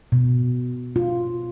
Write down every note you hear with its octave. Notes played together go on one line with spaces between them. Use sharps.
B2
F4